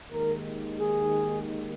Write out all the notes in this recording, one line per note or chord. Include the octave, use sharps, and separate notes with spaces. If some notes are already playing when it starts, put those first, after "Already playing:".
D#2 D#3 G#3 A#4
G#4